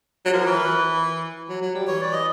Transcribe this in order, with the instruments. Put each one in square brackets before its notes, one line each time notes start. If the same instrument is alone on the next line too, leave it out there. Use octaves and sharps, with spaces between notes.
[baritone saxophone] F#3
[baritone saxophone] F3 [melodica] A#4
[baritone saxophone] E3
[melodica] B4
[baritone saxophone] E3
F#3
F#3
G3
[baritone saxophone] E3 [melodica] C#5
[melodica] D5
D#5